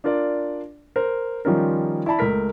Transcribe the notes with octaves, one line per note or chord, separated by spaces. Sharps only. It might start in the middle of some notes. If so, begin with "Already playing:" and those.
D4 F4 A#4 D5
A#4 C5
D#3 F3 G3 C#4 F4 A#4
E4 D5 A5 B5
C#2 A3 A#4 B6